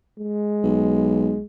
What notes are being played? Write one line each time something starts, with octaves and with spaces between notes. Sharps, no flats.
G#3
B1